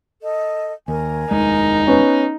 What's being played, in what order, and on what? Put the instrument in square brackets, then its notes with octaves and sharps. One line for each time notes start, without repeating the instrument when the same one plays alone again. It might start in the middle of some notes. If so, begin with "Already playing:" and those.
[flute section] A4 D#5
[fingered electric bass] D#2 [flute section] A#4 G#5
[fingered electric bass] F1 D#2 G#3 [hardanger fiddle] D#4
[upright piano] B3 C#4 [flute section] B4